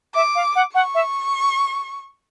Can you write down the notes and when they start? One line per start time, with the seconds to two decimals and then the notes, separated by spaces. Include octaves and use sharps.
0.15 E5 D6
0.35 F5
0.56 F#5
0.74 F#5 C#6
0.95 E5